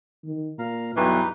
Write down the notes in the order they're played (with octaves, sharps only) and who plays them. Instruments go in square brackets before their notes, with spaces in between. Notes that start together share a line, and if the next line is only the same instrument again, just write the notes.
[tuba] D#3
[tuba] A#2 [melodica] F5 A#5
[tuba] B1 [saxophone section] G2 E3 [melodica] D#4 B4